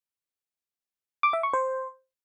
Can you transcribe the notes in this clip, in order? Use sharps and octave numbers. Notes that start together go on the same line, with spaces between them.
D6
E5
C#6
C5